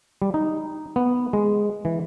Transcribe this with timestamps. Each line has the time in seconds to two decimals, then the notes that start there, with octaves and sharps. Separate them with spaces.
0.22 G3
0.34 D#4
0.96 B3
1.33 G#3
1.85 E3